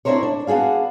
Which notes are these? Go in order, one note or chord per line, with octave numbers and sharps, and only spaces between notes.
D4 E4 F#4 A#4 C5 C#5
D4
B3 D4 F#4 G#4 F5